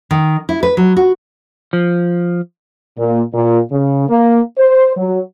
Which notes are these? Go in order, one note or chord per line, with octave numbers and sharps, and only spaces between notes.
D#3
E4
B4
F#3
F#4
F3
A#2
A#2
C#3
A#3
C5
F#3